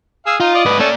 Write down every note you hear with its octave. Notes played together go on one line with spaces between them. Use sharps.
G#4 F5 E6
D#4 F4
D5 D#5
G#2 B4
A3 A#3 C#4 D5